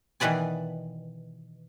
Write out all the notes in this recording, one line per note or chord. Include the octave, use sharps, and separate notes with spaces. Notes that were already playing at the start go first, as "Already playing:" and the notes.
B2 D#3 E3 B4 D5 G#5